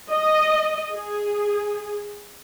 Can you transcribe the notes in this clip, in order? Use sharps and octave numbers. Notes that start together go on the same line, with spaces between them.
D#5
G#4